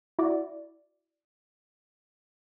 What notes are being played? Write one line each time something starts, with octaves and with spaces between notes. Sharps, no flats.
E4 F#4 D5